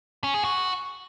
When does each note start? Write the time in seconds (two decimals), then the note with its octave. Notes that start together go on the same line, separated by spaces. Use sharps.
0.24 C#4
0.34 G#4
0.44 F#4